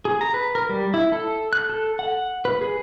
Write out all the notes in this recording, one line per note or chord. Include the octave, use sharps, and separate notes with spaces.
G#4
A#5
B4
A#4
G3
E4
A4
F#6
A4
F#5
B4
G#4